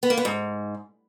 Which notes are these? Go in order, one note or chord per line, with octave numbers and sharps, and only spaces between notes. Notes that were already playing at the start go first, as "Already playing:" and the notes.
B3
A#3
B3
G#2